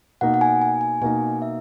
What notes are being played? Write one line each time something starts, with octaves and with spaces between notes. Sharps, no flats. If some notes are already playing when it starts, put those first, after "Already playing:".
B2 A#3 D#4 F#5
F#5
G#5
G#5
G#5
B2 A#3 D#4 G#5
E5